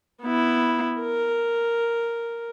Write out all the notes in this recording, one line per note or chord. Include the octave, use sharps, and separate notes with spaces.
B3 E4
A#4